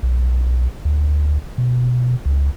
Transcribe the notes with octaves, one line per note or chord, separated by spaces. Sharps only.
B1
D2
B2
C#2